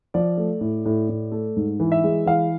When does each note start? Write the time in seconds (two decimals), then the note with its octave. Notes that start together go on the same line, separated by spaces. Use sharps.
0.14 F3 D5
0.37 A3
0.61 A2
0.85 A2
1.09 A2
1.32 A3
1.57 G#2
1.80 E3
1.92 E5
2.04 G#3
2.26 E3 F5